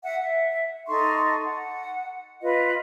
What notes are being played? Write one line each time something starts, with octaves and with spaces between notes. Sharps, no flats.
E5 F#5
E5
D#4 A4 C6 C#6
F#5
F4 B4 D#5